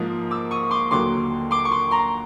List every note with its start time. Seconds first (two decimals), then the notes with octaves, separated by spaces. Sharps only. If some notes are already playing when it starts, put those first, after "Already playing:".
Already playing: G#2 F3 A#3 D#6
0.31 D6 E6
0.51 C#6 D#6
0.71 C6 D6
0.91 D#2 D3 F#3 A#3 C6 D6
1.51 C6 D6
1.65 C#6
1.71 C6 D6
1.91 A#5 C6